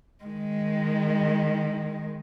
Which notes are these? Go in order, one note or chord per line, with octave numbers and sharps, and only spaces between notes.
D#3 G#3